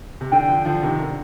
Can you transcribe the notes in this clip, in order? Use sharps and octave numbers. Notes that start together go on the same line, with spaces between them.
C3
D3 G5
D3 F3
D3 F3
C3 D#3
D3